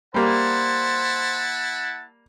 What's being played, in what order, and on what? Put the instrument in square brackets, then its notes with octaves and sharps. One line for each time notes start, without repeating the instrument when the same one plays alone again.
[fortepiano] G3 A#3 [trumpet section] E4 F#5 A5 [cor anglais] C5